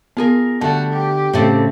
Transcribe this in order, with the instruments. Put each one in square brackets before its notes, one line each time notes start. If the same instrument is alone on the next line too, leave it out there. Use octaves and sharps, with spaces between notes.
[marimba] B3 [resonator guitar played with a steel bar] F4 G#4 A#4
[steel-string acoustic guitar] D3 [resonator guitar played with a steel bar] G3 A3 [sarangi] F#4 [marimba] A5
[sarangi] G4
[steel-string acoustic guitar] A2 C#3 [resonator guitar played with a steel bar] G3 A3 C4